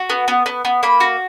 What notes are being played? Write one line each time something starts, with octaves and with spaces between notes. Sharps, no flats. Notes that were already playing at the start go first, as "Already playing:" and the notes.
Already playing: F#4
B3
B3
B3
B3
A#3 B5
F#4